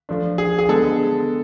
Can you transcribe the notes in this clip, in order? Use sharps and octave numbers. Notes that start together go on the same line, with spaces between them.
F3 A3 D4
G#4
G#4
D3 G#3 B3 A4